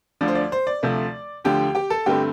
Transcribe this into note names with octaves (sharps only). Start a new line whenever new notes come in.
D2 D3 F3 D5
C5
D5
C5
D5
D2 C3 F3 A3
D2 D3 F3 G4 G5
G4 G5
A4 A5
G2 D3 A3 C4 G4 G5